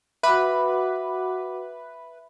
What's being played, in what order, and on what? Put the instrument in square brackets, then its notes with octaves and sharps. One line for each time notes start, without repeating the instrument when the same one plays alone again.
[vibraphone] F#4 F#5 D6 [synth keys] B4 [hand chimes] E5 B5